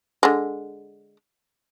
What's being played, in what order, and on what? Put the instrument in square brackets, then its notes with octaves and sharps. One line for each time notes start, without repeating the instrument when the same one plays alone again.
[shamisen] D3 G#3